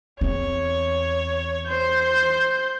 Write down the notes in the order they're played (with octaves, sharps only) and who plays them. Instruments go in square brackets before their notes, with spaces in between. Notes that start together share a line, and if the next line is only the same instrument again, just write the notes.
[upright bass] E2 C4 [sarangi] C#5
[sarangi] C5 [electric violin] G6